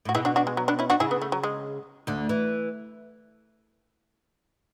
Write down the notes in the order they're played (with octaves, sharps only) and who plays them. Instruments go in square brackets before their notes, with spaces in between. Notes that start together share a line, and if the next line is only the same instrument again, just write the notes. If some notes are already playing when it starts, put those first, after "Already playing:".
[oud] A2 [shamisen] F#4
[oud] B2 [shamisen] E4 G#4
[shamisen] D4 F#4
D4 F#4
G#3
F#3
B3 D4
C#4 E4
D4 F#4
[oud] C#3 [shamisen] E4 G#4
[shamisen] B3
A3
F#3
G#3
[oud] D2 D3
E3